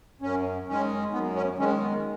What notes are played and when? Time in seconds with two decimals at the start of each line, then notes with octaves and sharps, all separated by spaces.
0.22 F#2 C#4
0.68 D#3 G#3 C#4
1.12 F#2 B3
1.35 C#4
1.57 D#3 G#3 C#4
1.80 B3